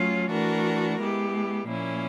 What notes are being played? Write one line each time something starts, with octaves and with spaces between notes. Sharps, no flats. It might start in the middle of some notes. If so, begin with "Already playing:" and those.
Already playing: F#3 A3 C#4 F4
E3 A3 D4 F#4 A#4
G#3 B3 E4 G4
A#2 F3 A#3 C#4 E4